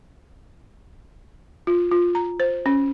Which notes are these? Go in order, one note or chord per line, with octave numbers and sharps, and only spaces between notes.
F4
F4
A#5
C5
C#4